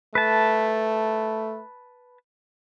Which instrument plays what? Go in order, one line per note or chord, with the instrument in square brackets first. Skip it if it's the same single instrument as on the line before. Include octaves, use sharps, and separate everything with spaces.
[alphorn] A3 [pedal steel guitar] B4 A5